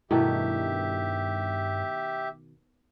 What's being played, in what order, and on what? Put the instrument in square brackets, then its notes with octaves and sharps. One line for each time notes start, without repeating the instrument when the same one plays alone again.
[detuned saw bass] G2 [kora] B2 D#3 A3 [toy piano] E4 [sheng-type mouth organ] G4 E5